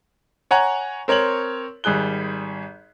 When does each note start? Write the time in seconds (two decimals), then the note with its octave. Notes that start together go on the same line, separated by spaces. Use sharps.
0.51 C#5 F#5 G#5 A#5
1.08 C4 A#4 C#5 C#6 F#7
1.84 G#1 G3 G#4 F#6 G7